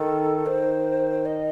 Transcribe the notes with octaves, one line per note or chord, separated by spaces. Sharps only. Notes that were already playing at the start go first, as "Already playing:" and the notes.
Already playing: D#3 A4
D#3 C5
D#5